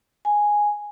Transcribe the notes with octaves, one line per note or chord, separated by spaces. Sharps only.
G#5